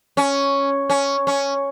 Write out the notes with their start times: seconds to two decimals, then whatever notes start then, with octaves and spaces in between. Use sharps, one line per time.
0.17 C#4
0.90 C#4
1.27 C#4